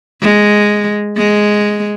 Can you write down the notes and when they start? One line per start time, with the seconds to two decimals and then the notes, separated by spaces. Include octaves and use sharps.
0.22 G#3
1.17 G#3